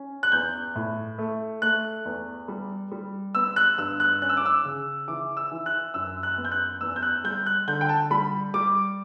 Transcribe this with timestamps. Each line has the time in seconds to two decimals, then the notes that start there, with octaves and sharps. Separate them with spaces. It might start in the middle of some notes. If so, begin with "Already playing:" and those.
Already playing: C#4
0.23 F#6
0.32 E2 G6
0.75 A2
1.18 A3
1.62 A3 F#6
2.05 E2
2.48 G3
2.91 G3
3.35 B3 E6
3.56 F#6
3.78 G2 E6
4.00 F#6
4.22 C#4 F#6
4.29 E6
4.37 D6
4.46 E6
4.65 C#3
5.08 E3 D6
5.37 E6
5.51 E3
5.66 F#6
5.94 F#2 E6
6.23 F#6
6.38 B3
6.45 G6
6.52 F#6
6.81 E2 E6
6.96 G6
7.02 F#6
7.24 G3 G6
7.46 F#6
7.68 D3 G6
7.81 G5
7.89 A5
8.10 G3 B5
8.54 G3 D6